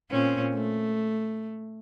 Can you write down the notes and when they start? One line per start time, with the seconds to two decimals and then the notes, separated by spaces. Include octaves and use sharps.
0.10 A#2 C4 C#4
0.53 A3